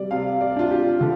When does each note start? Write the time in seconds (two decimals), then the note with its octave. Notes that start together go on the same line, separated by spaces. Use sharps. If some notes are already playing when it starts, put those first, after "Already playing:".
Already playing: C3 G3 D5
0.11 C3 F5
0.41 D5
0.56 D4 F4
0.71 G4
1.01 D3